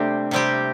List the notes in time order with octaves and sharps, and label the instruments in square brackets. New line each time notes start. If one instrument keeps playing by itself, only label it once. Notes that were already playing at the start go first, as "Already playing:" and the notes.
Already playing: [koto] C3 G3 C4 G4 [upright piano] A3 D4
[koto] C3 G3 C4 G4